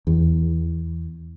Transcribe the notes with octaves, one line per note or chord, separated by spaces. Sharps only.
E2